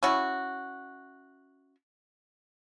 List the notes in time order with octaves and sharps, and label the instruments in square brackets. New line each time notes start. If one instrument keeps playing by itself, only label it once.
[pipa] C#4 E4 F#4